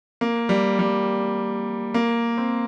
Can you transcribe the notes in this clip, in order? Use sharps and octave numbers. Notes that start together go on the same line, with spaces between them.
A#3
G3
G3
A#3
C4